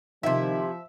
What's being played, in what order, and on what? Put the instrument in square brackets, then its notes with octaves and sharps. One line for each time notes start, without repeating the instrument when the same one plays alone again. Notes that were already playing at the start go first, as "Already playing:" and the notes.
[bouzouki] C3 E4 [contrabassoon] D#3 [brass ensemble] F3 [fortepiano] E5